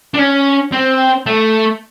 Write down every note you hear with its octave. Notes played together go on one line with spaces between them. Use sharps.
D4
C#4
C4
A3